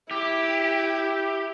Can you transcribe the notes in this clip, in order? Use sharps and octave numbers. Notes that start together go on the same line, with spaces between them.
E4 G4